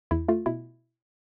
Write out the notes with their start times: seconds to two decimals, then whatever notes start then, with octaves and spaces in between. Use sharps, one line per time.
0.11 E2 E4
0.28 A3 F4
0.46 B2 E4